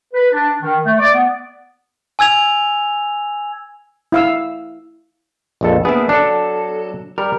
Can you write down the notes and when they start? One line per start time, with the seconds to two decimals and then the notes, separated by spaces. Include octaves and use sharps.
0.14 B4
0.32 D4
0.62 D#3
0.84 A3
0.99 D5
1.14 B3
2.19 G#5 E6 G#6 F7
4.12 E4 F5 E6
5.61 A#1 F2 A4
5.85 A#3 B3 D4 G#4 E5
6.09 F#3 D4 A4
7.18 G3 A#4